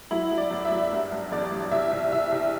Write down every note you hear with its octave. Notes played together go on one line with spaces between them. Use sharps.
F#3 E4
F#3
D5
F#2
E5
F#3
G2
G2
A1 D5
G2
C2 E5
C2
C2 E5
C2